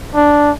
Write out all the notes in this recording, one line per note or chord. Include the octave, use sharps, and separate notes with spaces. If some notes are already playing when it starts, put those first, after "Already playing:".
D4